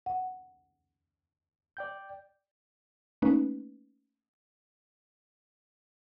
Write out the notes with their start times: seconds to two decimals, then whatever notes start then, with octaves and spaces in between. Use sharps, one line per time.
0.06 F#5
1.77 D5 G5 G6
3.22 A3 A#3 C#4 D#4 B4